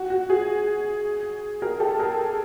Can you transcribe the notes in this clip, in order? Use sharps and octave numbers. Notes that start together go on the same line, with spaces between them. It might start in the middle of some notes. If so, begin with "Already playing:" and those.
Already playing: F#4
F#4
F#4 G#4
G#4 A#4
G4 A4
G#4 A#4